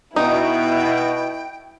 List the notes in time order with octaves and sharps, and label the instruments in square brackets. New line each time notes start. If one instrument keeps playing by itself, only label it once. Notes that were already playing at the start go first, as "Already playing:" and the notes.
[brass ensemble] B2 [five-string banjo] D#4 [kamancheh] E4 [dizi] G5